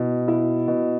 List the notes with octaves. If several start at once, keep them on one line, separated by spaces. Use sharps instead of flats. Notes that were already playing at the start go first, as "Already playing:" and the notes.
Already playing: B2 E4
E4
B2